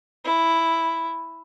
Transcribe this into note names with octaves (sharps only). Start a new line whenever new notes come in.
E4